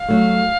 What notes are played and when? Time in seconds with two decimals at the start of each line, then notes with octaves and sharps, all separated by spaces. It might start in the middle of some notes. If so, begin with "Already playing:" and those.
Already playing: F5
0.08 F#3 A3